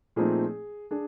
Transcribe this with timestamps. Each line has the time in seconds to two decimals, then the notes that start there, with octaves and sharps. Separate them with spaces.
0.16 A#2 F3 A3 C4 D#4 G#4
0.91 D4 G#4